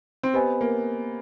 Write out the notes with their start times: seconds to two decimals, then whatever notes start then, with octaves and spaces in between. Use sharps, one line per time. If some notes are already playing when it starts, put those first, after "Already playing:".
0.23 C4
0.34 B3 G4 C5 D#5 G#5
0.61 A#3